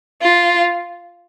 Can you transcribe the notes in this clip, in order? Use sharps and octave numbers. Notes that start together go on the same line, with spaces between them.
F4